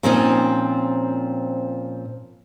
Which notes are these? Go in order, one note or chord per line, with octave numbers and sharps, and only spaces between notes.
A#2 F3 C4 C#4 D#4